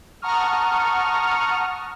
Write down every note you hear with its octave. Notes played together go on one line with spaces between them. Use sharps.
F#5 A5 A#5 C#6 D#6 F6